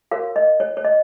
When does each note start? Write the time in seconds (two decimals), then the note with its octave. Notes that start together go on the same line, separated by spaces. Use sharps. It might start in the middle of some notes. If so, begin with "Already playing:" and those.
0.11 F#4 A#4 C#5 F5
0.36 D#5
0.60 C#5
0.77 C#5
0.85 D#5